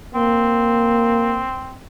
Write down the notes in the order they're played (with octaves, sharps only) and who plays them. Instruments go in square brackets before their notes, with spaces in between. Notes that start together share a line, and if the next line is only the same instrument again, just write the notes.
[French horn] A#3 [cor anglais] C4